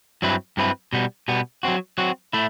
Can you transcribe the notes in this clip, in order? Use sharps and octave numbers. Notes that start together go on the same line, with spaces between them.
G2 F#3 C4 E4 B4
G2 F#3 C4 E4 B4
B2 G3 B3
B2 G3 B3
F#3 C4 F#4
F#3 C4 F#4
A3 E4